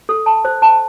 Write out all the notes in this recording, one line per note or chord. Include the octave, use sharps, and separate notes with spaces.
A4
A5
C5
A5